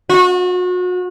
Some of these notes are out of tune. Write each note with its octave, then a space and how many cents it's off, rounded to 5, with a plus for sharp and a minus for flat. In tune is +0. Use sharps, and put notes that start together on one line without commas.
F#4 -35